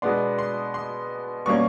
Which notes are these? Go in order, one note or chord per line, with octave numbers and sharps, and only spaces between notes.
B2 G#3 B3 D4 C6
C6
C6
B2 G3 A#3 C#4 C#6